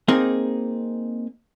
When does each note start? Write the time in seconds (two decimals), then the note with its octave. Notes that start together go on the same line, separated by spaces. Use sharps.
0.08 A#3 C4 D#4 G#4